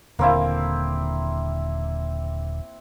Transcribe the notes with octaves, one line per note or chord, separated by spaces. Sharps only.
D#1 D3 A#3 C4 E4